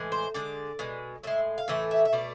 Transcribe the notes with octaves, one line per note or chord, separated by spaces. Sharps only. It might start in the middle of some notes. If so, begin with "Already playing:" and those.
Already playing: A2 E3 G#3
C5
D3 G#3 D5
B2 G#3
A2 G#3 E5
F5
A2 E3 A3 E5
E5
E5
B2 A3 D5